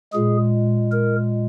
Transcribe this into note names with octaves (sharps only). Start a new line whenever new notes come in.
A#2 G#3 G#4
A#4